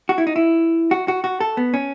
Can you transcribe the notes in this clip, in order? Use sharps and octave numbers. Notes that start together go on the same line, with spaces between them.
F#4
E4
D#4
E4
F#4
F#4
F#4
A4
B3
C#4